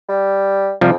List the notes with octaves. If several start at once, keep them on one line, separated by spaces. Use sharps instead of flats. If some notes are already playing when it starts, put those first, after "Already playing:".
G3
F2 C3 F3 G3